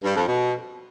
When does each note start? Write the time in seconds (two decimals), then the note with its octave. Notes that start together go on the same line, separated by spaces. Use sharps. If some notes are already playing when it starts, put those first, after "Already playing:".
0.04 G2
0.15 F2
0.27 B2